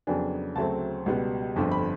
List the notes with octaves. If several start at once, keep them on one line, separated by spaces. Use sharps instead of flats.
F2 C#3 F#3 B3 D4 G#5
D2 C#3 F#3 A3 C4 A5
C#2 B2 G3 B3
G1 F2 D3 F3
B5